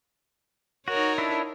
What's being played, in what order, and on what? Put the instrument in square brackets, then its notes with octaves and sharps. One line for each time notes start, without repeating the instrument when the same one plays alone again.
[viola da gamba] D#4 A#4 C#5 [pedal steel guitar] F#4
[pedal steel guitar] D4 E4 A4